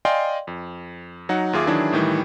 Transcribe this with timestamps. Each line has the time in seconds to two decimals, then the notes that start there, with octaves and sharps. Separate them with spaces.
0.05 D5 D#5 F5 G5 G#5 C6
0.47 F2
1.29 F#3 D#4 F#5
1.53 D#2 F4 G#4 E5 D6
1.67 D#3 E3 F#3 D4 E4 G#4
1.92 A2 D#3 E3 G3